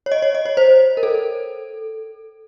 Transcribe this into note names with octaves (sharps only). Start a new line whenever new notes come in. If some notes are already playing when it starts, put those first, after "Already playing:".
C#5
D#5
C#5
D#5
C#5
C5
A#4
A4